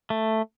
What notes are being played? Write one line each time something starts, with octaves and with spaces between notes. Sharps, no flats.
A3